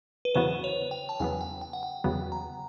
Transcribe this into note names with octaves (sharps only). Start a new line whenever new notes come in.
B4
E2 C#3 F#3 B3 C5
C#5
G5
A5
E2 C#3 F#3 B3 G#5
G5
G5
F#5
G5
E2 C#3 F#3 B3
A#5